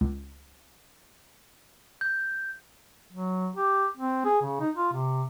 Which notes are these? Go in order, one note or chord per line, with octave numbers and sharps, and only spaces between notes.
C#2
G6
F#3
G4
C4
G#4
C#3
D#4
F4
C3